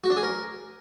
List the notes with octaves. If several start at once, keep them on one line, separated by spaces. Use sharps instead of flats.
F#4
D4
G#4
A#4